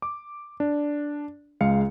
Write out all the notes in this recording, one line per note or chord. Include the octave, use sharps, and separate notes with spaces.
D6
D4
C#2 G#3 F5 C#7